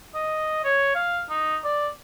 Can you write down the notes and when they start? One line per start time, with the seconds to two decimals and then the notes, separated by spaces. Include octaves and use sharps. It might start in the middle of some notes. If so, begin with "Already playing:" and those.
0.15 D#5
0.64 C#5
0.95 F5
1.29 D#4
1.64 D5